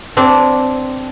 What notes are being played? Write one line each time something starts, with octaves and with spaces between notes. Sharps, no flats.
C4 D4